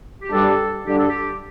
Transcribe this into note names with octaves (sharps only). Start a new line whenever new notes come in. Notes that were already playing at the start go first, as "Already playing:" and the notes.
G4
G2 G3 D4 A4
G2 D3 G3 D4 G4
A4
G4